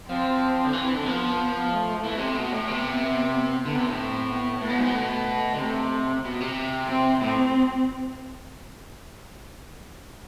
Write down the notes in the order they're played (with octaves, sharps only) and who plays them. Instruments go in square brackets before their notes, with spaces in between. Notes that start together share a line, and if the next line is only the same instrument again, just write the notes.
[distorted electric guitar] F3 [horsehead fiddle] C4
[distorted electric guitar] D3
E3
E3
D3
[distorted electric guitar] F3 [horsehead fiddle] B3
[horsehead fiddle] A3
[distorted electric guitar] E3
B2
C3
B2
A2
[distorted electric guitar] C3 [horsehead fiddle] B3
[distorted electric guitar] D3 [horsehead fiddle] B3
[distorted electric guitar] C3
A2
[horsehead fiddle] C4
B3
[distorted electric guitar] A2 [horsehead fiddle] B3
[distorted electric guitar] B2
G#2
B2
[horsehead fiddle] A3
[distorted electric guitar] D3
[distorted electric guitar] C3 [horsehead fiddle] A3
[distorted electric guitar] B2
C3
[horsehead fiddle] C4
[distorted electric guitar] A2 [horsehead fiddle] C4